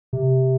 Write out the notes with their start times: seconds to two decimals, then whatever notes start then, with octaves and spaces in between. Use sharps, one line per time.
0.13 C3